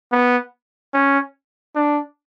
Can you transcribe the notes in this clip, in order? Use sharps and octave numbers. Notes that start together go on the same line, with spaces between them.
B3
C#4
D4